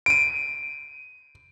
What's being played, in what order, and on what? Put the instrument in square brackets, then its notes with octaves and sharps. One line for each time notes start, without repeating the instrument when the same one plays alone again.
[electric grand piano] D7 D#7